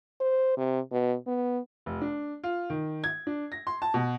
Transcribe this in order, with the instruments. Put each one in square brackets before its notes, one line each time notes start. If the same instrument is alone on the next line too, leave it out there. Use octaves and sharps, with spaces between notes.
[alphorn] C5
C3
B2
B3
[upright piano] F1
D4
F4
D#3
G#6
D4
A#6
C6
A5
B2